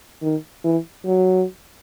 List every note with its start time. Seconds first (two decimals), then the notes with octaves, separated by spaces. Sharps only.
0.22 D#3
0.64 E3
1.06 F#3